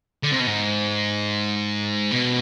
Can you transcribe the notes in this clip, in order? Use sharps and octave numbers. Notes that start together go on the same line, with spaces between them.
D3
C3
B2
G#2
B2